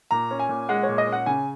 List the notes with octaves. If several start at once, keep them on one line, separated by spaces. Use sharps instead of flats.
A#2 A#5
C#4
G#5
A#2
G#3 F#5
C#5
A#2
D#5
C#4
F#5
C#3 G#5